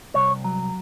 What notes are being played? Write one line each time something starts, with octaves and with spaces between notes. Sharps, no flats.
C2 C#5
F#3